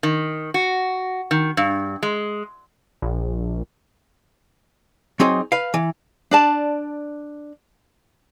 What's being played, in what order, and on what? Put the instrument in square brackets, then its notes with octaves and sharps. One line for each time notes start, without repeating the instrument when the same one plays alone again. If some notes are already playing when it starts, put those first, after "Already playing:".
[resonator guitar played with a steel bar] D#3
F#4
D#3
G2
G#3
[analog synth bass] A#1
[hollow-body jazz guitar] F#3 C4 D#4 G#4
B4 F5
E3
[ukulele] D4 D5 A5